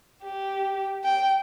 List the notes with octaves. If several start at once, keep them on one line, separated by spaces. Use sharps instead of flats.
G4
G5